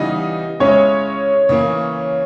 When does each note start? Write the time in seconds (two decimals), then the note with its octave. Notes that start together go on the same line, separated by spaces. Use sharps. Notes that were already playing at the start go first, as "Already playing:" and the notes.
Already playing: C#3 E3 G3 B3 D#4 D#5
0.60 C#3 G#3 C#4 E4 C#5
1.49 C#3 E3 A#3